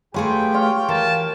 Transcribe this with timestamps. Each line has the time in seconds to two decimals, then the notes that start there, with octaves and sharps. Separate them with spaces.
0.14 F#3 A3 F4 G4 G#4 B4 G5
0.54 F4 C#5 F5
0.89 E3 A#4 F5 A5